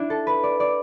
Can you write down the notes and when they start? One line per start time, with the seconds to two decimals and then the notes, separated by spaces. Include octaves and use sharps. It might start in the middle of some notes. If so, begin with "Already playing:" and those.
Already playing: D4 E4
0.10 A4
0.27 B4
0.43 D5
0.60 D5